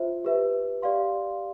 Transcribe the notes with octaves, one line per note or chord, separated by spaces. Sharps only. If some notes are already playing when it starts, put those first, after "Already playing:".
Already playing: F4 C5 E5
G4 B4 E5
G4 D5 F5 C6